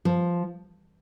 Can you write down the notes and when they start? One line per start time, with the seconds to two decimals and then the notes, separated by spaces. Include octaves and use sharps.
0.05 F3